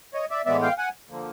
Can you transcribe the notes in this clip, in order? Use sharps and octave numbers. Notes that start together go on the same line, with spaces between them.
C#5 D#5
D5 E5
A2 E3 G#3 B3 D5 E5
F5 G5
F#5 G#5
D3 F3 A#3